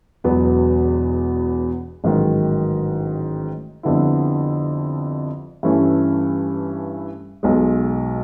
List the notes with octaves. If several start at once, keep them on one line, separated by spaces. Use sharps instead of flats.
E1 E2 B2 F#3 B3
A1 G#2 D#3 F#3
F2 D3 G3 B3 E4
G2 E3 A3 C#4 E4
B1 B2 G#3